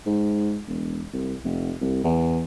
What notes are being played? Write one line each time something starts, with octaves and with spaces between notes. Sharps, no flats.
G#2
E1
C2
F1
C2
E2